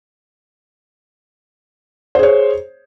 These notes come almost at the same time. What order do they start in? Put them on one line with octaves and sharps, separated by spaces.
C5 G#4 C#5